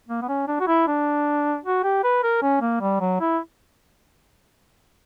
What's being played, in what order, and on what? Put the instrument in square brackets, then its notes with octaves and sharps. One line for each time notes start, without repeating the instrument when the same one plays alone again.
[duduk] A#3
B3
C#4
D4
F#4
E4
D4
F#4
G4
B4
A#4
C#4
A#3
G3
F#3
E4